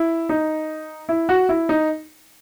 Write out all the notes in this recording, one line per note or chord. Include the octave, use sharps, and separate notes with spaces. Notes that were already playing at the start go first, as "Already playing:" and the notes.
Already playing: E4
D#4
E4
F#4
E4
D#4